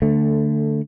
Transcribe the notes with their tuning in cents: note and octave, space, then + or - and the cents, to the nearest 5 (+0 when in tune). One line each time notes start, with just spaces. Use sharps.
D3 +0 A3 +10